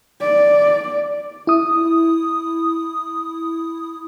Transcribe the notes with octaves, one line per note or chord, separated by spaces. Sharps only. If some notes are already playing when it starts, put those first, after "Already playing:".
D5
E4 D#6